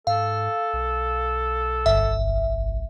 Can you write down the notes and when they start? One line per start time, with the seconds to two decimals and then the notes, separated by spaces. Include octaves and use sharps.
0.07 G#2 A4 F5
0.73 B1
1.86 G1 E5